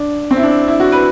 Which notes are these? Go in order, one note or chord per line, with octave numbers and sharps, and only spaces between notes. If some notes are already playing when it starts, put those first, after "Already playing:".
Already playing: D4
C4
E4
D4
E4
F#4
B4